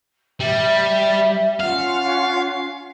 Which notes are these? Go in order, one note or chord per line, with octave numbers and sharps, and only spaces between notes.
G3 E5
C#4 F4 F5 F#5